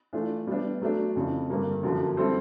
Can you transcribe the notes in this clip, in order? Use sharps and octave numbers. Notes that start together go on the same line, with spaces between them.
E3 A3 D4 F4
G3 B3 D4
F#3 A3 D4
F2 C#3 E3
G2 D3 G3 A#3
F#2 D3 F3 A#3
G3 C4 E4 A4 C5